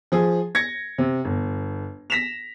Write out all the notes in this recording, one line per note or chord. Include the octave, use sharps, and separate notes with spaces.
F3 G#4
G#6 A#6 C#7
C3
G1
A#6 B6 E7 F7